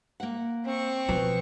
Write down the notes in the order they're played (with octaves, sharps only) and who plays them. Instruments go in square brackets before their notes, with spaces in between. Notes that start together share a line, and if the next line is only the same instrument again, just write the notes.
[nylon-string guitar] A#3 F#5
[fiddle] C4 C#6
[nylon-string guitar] B2 [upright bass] F3